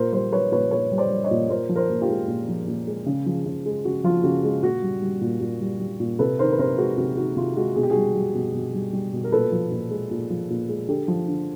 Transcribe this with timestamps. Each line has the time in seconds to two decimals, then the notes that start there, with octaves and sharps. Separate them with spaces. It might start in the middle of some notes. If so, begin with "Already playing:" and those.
Already playing: A#2 A#4 C5
0.13 G3 A#4 C5
0.32 G3 B4 C#5
0.52 A#2 B4 C#5
0.71 A#2 B4 C#5
0.92 G3
0.98 C5 D5
1.10 G3
1.24 C#5 D#5
1.31 A#2
1.49 A#2 A#4 C5
1.69 F3
1.76 A#4 C5
1.90 A#2
2.02 F4 G4
2.09 G#3
2.28 A#2
2.48 F3
2.68 A#2
2.87 G#3
3.06 C#3
3.26 F3
3.46 C#3
3.65 G#3
3.85 C#3 F#4
4.04 F3 F4
4.23 C#3 F#4
4.44 G#3
4.63 A#2 F#4
4.82 G3
5.02 G3
5.21 A#2
5.41 A#2
5.61 G3
5.80 G3
6.00 A#2
6.19 C3 A4 B4
6.39 D#3 A#4 C5
6.53 B4
6.59 C3 A#4 C5
6.78 G#3 F#4
6.98 C3 F#4
7.17 D#3 F#4
7.36 C3 F4
7.56 G#3 F#4
7.75 B2 G#4
7.83 G4
7.90 F#4 G#4
7.96 G3
8.16 G3
8.35 B2
8.54 B2
8.74 G3
8.93 G3
9.13 B2
9.24 A#4
9.32 A#2 A4 B4
9.52 F3
9.71 A#2
9.90 G#3
10.11 A#2
10.30 F3
10.50 A#2
10.69 G#3
10.88 D3 G4 A4
11.08 F3
11.28 D3